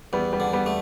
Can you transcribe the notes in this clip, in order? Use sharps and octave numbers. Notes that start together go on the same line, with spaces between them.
E2 G3 B3
G3 B3
D3
G3 B3
A3